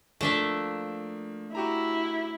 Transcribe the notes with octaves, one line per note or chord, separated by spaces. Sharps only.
F3 A3 A#3 D4 E5
E4 F#4 G4 A#5